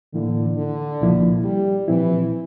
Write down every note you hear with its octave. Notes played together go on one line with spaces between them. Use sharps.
A2 D3 E3 A#3 E4
D3
C2 A#2 F3 A#3 E4
G3
A#2 E3 F3 C4 E4